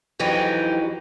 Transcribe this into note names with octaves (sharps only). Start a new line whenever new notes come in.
F2 E3 F#3 D#4 G4